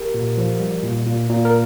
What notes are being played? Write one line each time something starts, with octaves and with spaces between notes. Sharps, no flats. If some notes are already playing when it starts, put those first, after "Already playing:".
Already playing: G4 A#4
A#2
F3
G3
A#2
A#2
A#2
A#4